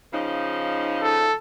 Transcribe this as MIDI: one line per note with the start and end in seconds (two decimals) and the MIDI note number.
0.13 1.31 49
0.13 1.31 53
0.13 1.31 63
1.02 1.36 69